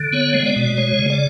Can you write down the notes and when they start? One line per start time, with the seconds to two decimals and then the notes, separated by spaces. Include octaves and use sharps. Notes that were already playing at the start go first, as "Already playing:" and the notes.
Already playing: D3
0.13 B3 C#5
0.34 G#3
0.46 D5
0.56 B2
0.77 G#3 C#5
0.99 C#3
1.10 D5